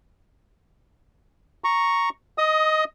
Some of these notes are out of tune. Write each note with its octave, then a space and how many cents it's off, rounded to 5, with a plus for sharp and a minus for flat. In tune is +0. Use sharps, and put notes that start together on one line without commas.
A#5 +0 C#6 +0
D#5 +0 D#6 +25